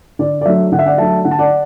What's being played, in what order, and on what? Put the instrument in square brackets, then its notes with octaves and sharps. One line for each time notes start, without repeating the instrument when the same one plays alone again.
[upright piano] D3 D5
D5
F#3 A3 D4 E5
D3 F#5
E5
D5 F#5
F#3 A3 D4 E5 A5
D3 F#5
A5
D5 F#5